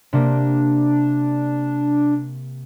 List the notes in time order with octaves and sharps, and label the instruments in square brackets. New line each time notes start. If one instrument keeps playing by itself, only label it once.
[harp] C3 A#3 G4 [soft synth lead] D4